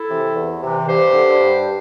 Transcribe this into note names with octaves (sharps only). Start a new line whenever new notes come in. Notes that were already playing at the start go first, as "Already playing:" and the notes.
Already playing: E4 A4
C3 E3
E2
C3 E3
G2 G4 C5
D3
G2